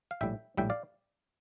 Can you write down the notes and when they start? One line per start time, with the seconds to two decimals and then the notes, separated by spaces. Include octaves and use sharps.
0.11 F5
0.21 A#1 A2 G3 E5 G5
0.57 A#1 A2 G3 E5 G5
0.70 D5 F5